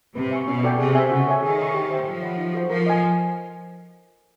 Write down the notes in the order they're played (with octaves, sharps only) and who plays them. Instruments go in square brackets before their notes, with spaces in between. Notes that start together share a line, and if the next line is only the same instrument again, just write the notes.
[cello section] C3 [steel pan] B4
[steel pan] E5 G#5 C#6
[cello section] B2 [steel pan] C#4
[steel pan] F#4 A4 D5 G5
[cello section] C3 [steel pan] G#4
[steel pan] C5 E5 G#5
[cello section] C#3 [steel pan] F#4
[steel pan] A4 C#5 E5 G#5
[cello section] D#3 [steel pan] G#4
[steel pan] C#5 F5 A#5 C#6
G4
C5 E5 G5 C6
[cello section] F3 [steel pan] A4
[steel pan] C#5 F#5 B5
D#4
F#4 A4 C5
[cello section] F3 [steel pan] A#4
[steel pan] D#5 G#5